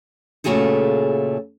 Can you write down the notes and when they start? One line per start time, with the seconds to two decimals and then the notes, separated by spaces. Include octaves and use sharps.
0.44 A#2 C#3 A3 F#4 G#4 A4